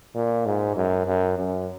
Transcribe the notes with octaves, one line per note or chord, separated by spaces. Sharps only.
A#2
G#2
F#2
F#2
F#2